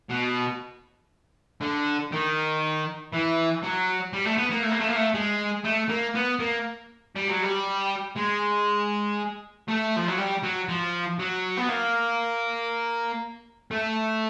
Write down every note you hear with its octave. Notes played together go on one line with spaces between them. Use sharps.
B2
D3
D#3
E3
F#3
G3
A3
B3
A#3
A3
A#3
A3
A#3
A3
G#3
A3
A#3
B3
A#3
G3
F#3
G3
G#3
A3
F3
F#3
G3
F#3
F3
F#3
B3
A#3
A3